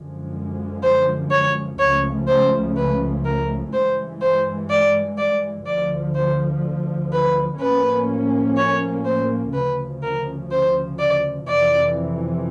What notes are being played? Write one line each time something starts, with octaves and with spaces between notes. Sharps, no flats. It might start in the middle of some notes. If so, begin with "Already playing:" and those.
Already playing: F#2 D3 F3 G#3
C5
C#5
C#2 C#3 F3 A3 C#5
C5
B4
A#4
G2 E3 G#3 C5
C5
D5
D5
D2 D3 F3 D5
C5
B4
A2 F3 A#3 C#4 B4
C#5
C5
D2 C#3 F3 B4
A#4
C5
D5
F2 C3 E3 D5